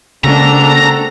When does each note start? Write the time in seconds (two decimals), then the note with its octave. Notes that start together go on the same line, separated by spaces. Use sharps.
0.24 C#3 G#3 A#3 C4 D4 F#4 A4 A#5